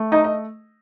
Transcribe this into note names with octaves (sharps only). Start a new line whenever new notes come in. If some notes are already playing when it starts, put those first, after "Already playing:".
Already playing: A3
D#4 D#5
D#5